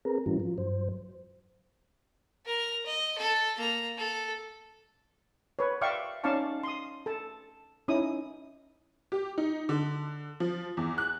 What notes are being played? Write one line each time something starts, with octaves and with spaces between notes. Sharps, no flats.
C4 G#4 A#4 B4 A#5
G#2 E3 G3 C#4 E4 F#4
F3 F#3 F4
G2 F#3 C5
A#4 A#5
D#5
A4 A5
A#3 A#5
A4
B4 C#5
D5 E5 F5 G5 C#6
C#4 D#4 D5 F5 A5 C#6
C6 D#6
A4 A5
C#4 D#4 E4 D#6
G4
D#4
D3
F3
E2
F#6